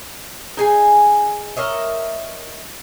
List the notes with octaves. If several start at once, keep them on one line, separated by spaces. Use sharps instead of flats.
D#4 G#4 G#5
A#4 C#5 D#5 E5